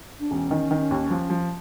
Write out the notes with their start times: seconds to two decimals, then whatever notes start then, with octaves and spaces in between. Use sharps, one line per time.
0.20 D4
0.31 E1 C#4
0.51 D#3
0.71 D#3
0.91 D#2
1.10 F3
1.30 F3